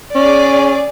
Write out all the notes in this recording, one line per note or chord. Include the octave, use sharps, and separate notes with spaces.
C#4 G#4 D5